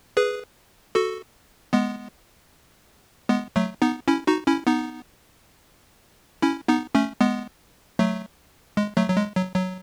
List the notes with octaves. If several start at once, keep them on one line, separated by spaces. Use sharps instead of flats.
G#4 B4
F#4 A4
G#3 B3
G#3 B3
F#3 A3
B3 D#4
C#4 E4
D#4 F#4
C#4 E4
B3 D#4
C#4 E4
B3 D#4
A3 C#4
G#3 B3
F#3 A3
G#3
F#3 A3
F#3
G#3
F#3
F#3